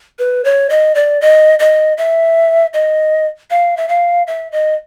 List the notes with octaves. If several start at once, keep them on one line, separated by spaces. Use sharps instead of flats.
B4
C#5
D#5
D5
D#5
D#5
E5
D#5
F5
E5
F5
E5
D#5